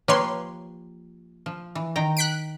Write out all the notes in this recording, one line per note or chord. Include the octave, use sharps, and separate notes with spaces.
F3 A#3 G4 B4 C#5 C6
F3
E3
D#3 G5 A#5
F#6 B6 D7